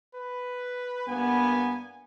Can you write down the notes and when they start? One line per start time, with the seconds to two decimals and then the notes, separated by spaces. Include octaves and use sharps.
0.15 B4
1.07 G2 A#3 B3 G#5